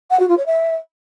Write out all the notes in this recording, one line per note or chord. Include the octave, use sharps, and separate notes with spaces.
F#5
F#4
F4
C#5
E5